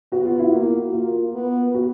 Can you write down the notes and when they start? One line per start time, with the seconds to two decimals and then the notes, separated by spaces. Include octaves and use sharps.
0.12 B3 F#4
0.25 F4
0.39 E4
0.52 A#3 F#4
0.93 A#3 F4
1.34 B3
1.74 F#4